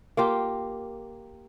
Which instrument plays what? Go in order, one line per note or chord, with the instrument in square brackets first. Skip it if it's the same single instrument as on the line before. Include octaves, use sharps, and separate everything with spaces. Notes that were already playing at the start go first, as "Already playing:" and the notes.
[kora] A#3 F4 G4